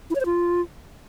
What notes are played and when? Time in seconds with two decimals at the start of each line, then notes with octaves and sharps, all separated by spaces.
0.10 E4
0.15 C#5
0.20 C5
0.25 F4